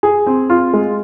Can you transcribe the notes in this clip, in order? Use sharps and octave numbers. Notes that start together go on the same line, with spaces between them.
G#4
C4
F4
G#3